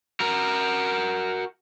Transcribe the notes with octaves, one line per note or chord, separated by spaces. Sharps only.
F#4 A#4